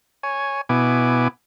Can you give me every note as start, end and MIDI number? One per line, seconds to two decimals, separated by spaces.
0.23 0.61 73
0.23 0.61 80
0.69 1.28 47
0.69 1.28 59
0.69 1.28 64
0.69 1.28 80
0.69 1.28 86